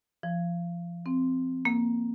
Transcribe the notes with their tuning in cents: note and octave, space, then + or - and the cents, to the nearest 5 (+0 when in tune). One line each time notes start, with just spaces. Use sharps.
F3 -25
C4 -10
A#3 +5